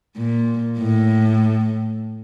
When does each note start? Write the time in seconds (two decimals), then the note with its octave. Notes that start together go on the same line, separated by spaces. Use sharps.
0.17 A#2
0.78 A2